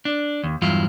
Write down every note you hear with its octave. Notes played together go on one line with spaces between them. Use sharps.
D4
D#2
E2 G2 F#3 E4 F4